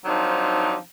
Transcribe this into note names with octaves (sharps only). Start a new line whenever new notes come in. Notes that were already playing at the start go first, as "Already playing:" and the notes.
D#3 F3 F#3 C4 D4 D#4